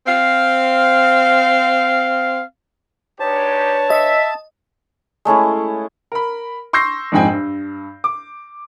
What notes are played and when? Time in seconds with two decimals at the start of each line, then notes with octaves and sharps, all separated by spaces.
0.07 C4 F5
3.20 G#3 D4 D#4 G4 B4 C#5 A5
3.90 D#5 E5
5.25 G#3 A3 C#4 E4
6.12 A#4 B5
6.73 C6 C#6 E6 G6 A#6 C7
7.12 A#1 F2 G#2 G#3 G5 G#5
7.32 G2
8.04 D6